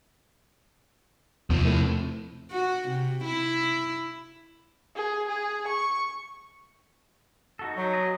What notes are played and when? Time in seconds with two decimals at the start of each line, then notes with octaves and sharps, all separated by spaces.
1.50 E2 C3 F3
1.65 A2
2.51 F#4
2.89 C3
3.24 E4
4.95 G#4
5.28 G#4
5.67 C#6
7.59 D#4 F#4 A4
7.77 F#3 D#4 F#4
7.93 B3 G#4 D#5